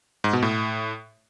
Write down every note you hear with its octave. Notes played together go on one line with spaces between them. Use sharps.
G#2
B2
A2